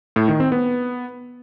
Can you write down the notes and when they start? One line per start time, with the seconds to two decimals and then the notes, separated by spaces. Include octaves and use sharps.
0.16 A2
0.28 D#3
0.40 C4
0.52 B3